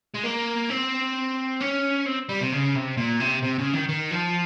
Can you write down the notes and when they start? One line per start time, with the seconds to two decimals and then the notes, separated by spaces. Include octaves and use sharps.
0.15 G#3
0.24 A#3
0.70 C4
1.61 C#4
2.06 C4
2.29 G3
2.41 C3
2.52 C#3
2.75 C3
2.97 A#2
3.20 C3
3.42 C3
3.58 C#3
3.73 D#3
3.88 D#3
4.11 F3